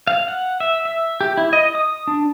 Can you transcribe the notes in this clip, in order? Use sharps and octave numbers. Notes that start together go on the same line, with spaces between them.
F5
F#5
E5
E5
G4
E4
D#5
D#6
D4